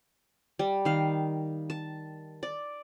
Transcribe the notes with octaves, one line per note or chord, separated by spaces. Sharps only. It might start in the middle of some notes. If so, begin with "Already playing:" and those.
G3
D#3 F5
A5
D5